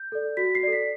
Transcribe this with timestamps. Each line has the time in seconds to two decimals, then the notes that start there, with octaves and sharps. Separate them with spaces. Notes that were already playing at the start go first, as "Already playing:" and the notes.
Already playing: G6
0.12 A4 D5
0.37 F#4 B6
0.55 C7
0.63 A4 D5
0.73 B6